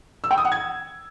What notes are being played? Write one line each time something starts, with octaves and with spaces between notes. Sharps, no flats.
E6
G5
D#6
F#5
G#6